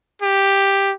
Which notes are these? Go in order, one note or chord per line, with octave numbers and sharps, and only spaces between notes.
G4